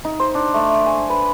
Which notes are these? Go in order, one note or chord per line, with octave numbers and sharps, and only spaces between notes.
D#4
C5
D4
A3
G#5
B4